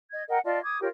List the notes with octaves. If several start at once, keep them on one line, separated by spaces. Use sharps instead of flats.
D#5 G#6
A#4 D#5 F#5 G5
F4 D5 D#5 A5
D6 D#6 G#6
F4 G4 A#4 C#5